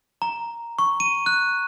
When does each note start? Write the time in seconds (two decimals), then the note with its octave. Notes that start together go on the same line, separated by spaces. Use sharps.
0.22 A#5
0.79 C#6
1.00 D#7
1.26 F#6